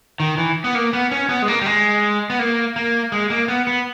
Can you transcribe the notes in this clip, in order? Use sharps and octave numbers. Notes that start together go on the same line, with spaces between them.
D#3
E3
B3
A#3
B3
C#4
B3
G#3
A#3
G3
G#3
B3
A#3
A#3
G#3
A#3
B3
B3